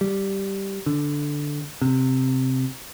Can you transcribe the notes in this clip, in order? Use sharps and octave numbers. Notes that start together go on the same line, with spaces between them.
G3
D3
C3